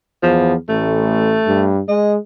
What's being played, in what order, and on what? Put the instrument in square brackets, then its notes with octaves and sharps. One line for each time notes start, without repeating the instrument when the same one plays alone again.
[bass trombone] E2 [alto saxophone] F3
[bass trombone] A1 [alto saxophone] A3
[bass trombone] G2
[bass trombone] G#3 [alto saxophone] D#5